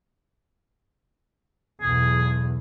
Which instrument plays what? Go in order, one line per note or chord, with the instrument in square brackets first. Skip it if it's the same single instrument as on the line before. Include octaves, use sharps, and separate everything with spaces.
[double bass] B1 E2 [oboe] G#4